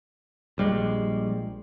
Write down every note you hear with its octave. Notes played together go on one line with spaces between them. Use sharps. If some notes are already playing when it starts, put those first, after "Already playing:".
A#1 G3 G#3